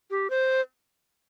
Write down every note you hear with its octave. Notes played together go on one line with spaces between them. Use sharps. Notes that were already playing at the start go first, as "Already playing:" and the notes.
G4
C5